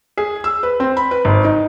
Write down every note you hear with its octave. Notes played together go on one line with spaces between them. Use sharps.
G#4
E6
B4
C4
B5
B4
G#1
D#4